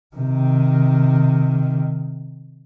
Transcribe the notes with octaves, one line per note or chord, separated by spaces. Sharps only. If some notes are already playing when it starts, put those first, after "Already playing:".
C3 D#3